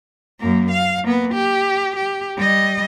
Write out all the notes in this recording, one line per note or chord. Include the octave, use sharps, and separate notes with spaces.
F#2 A#3
F5
A#3 B3
G4
G4
G3 D#5